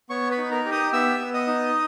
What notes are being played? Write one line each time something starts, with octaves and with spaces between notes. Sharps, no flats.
B3 C#5 C#6
B4 B5
D#4
A#4 A#5
G4
D#5 D#6
B3 E5 E6
B3
D#5 D#6
D#4